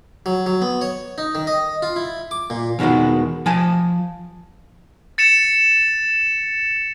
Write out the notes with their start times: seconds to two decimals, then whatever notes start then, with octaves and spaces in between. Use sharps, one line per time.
0.26 F#3
0.46 F#3
0.62 B3
0.81 C#5
1.18 D#4
1.35 D#3
1.47 D#5
1.82 F4
1.96 E4
2.31 D6
2.50 A#2
2.79 E2 B2 D#3 G#3 F#4
3.46 F3 G#5 A5
5.18 A6 C#7 E7